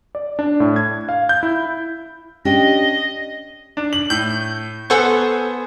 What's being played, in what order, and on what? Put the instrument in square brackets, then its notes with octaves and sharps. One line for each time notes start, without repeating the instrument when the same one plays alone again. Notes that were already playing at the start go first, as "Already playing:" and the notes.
[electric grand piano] D5
D4
A2
G#6
F5
G6
E4
[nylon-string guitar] C#4 D4 G4 [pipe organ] D#5
[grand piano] D4
F#7
[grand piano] A2 [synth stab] G6
[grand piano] B3 C5 G#5 [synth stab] A4 F#5 C#6